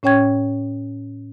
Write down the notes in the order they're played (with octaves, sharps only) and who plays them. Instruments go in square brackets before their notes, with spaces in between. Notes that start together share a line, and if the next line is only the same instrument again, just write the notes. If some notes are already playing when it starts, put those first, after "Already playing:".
[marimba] A2 C#4 C#5 G5 C#6 G#6